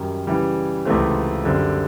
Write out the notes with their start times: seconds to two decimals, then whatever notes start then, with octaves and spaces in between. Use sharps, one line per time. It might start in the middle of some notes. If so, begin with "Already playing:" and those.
Already playing: F#2 D#3 G3
0.27 C#3 E3 G3
0.85 C#2 C3 E3 A3 C4
1.44 F#2 D3 G3 C4